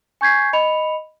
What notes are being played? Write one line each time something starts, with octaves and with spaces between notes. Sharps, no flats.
G#5 C#6 G6 G#6 B6 C7
D#5 B5 C#7 F7